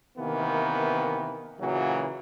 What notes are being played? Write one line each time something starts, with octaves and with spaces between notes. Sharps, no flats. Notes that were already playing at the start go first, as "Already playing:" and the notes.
C3 D#3 E3 A#3 B3
A#2 C#3 E3 F#3